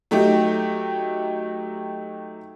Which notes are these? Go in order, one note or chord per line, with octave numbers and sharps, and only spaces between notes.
F#3 A3 D#4 G4